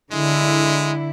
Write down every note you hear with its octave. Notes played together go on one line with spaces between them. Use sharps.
D3 G#3 E4